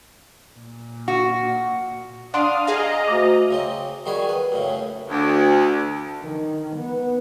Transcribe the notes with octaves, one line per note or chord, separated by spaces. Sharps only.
A#2
F#4
D4 F5 F#5 C6 D#6 D7
G#4 D#5 F5 A#5
D2 D6
C#3 C4 D#5
D#3 G3 F#4 G#4 B5
B4
F#2 A2 C#3
D2
D#3
B3